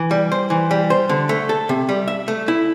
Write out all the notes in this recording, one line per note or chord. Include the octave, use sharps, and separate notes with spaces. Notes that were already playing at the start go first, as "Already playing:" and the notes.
Already playing: E3
G3
C5
E3
G3
C5
D3
A3
A4
C3
G3
E5
A3
E4